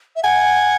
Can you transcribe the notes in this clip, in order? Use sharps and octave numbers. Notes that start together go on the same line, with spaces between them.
E5
F#5 G#5